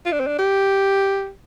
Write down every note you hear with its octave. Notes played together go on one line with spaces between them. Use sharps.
F4
D4
C4
D4
G4